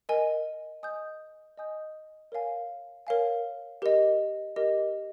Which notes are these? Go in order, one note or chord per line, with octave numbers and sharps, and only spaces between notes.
A#4 D#5 G#5
D#5 G#5 D#6 G6
D#5 G#5 D#6 G6
A#4 C#5 F5 G#5
A#4 C#5 F5 G#5
G4 A#4 D#5
G4 A#4 D#5